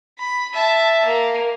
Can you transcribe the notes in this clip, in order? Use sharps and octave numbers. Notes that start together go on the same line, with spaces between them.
B5
E5 A5
A#3